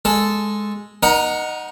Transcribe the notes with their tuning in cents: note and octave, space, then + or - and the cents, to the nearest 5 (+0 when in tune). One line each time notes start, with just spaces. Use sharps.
G#3 +0 A4 -5
D#4 -10 A#4 +35 F#5 +0